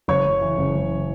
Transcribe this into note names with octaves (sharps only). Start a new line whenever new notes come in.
F#1 C#5 C#6
F#1
E3
F#1
F#1